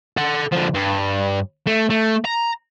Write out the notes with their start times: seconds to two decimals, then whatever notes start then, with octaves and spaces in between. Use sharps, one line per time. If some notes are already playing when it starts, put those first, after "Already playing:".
0.17 A4 F#5
0.52 D3 F3
0.74 G2
1.67 A3
1.90 A3
2.25 A#5